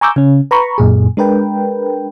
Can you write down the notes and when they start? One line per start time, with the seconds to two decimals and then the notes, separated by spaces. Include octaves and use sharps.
0.01 G#5 A#5 C#6 D6 E6 G6
0.16 C#3 C#4
0.51 B4 A#5 B5 C#6
0.78 F#2 A#2 G#4
1.17 G#3 D4 A#4 B4 G5